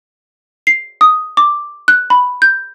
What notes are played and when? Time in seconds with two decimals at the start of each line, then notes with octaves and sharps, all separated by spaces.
0.67 C7
1.01 D#6
1.37 D6
1.88 F#6
2.10 B5
2.42 G6